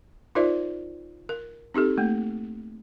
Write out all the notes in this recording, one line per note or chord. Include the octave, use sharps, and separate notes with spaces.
D#4 F4 A#4 C5 D5 E5
A#4
C4 D#4 G4 A4
A3 A#3